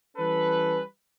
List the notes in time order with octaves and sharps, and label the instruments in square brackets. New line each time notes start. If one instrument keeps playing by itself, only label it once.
[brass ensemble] E3 G3 C#4 A4 B4